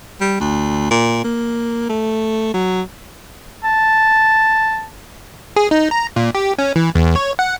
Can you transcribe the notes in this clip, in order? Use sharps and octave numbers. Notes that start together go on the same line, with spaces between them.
G3
D2
A#2
A#3
A3
F#3
A5
G#4
D#4
A#5
A#2
G4
C#4
E3
E2
C#5
F#5